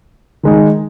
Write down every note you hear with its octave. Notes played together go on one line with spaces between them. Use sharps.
D#3 G#3 D#4